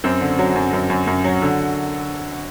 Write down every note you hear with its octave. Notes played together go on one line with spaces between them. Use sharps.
F#2 C4
D3
F#3
F#2
F#2
F#2
F#2
F#3
D3